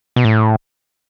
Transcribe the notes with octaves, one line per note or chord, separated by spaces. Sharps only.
B2
A2